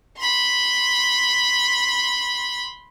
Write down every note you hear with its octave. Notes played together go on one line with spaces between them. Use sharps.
B5 C6